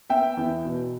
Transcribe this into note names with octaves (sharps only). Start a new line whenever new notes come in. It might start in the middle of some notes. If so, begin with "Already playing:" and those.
B3 E5 G5
E2
B2